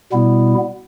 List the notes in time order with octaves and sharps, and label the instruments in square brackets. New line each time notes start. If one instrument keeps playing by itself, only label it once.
[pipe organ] B2 G3 B3 E4